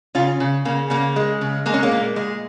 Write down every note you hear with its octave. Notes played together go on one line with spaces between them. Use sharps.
C#3 C#4 F4
C#3
C#3 A#3
C#3 A#3
G#3
C#3
G#3 A#3
C#4
A#3
A#2
G#3